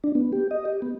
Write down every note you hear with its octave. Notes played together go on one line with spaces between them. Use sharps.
D4
B3
G4
D#5
G4
B3